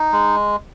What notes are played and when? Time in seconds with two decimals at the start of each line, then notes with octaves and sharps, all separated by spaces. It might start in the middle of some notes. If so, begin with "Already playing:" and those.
Already playing: D#4
0.12 G#3